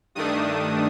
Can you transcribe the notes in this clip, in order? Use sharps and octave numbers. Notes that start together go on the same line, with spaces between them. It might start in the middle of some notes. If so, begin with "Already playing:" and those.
G2 D#3 A3 D4 D#6